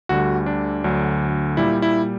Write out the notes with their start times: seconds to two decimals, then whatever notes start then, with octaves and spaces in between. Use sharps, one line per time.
0.09 D2 D3 G3 F#4
0.46 D4
0.84 D2 D3 F#3
1.57 A#2 G3 E4
1.82 E4